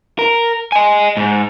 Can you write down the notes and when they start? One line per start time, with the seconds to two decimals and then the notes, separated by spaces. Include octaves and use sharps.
0.19 A#4
0.72 D#5 G#5
1.17 G#2